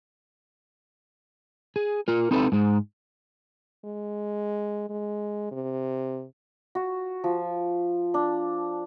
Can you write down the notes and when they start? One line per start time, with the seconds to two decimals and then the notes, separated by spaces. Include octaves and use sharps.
1.76 G#4
2.08 F4 A#4
2.31 C4 D#4 E4 A4 B4
2.52 G#2 G#3
3.85 G#3
4.89 G#3
5.51 C3
6.75 F#4
7.24 F3
8.14 D4